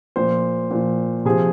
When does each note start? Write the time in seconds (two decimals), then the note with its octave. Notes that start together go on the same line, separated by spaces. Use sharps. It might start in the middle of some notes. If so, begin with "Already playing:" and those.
0.16 A#2 F3 C5
0.71 A#2 F3
1.25 C3 F3 G#4